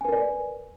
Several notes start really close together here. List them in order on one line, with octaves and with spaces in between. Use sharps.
G#5 B4 A#4 D5